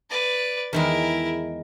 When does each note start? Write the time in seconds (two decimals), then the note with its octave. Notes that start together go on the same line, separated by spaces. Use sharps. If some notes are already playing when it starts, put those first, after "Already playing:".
0.10 B4 D5
0.73 E2 D#3 G#3 E4 A#4